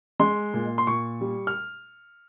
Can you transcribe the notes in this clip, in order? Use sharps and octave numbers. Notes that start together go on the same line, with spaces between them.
G#3 C6
A#2
C6
A#2 C#6
G3
F6